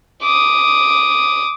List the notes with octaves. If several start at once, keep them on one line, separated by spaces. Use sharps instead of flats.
D6 D#6